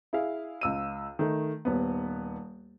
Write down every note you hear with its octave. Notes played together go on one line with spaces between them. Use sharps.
E4 G#4 F5
C#2 E6 D#7
D#3 A3
D#1 B3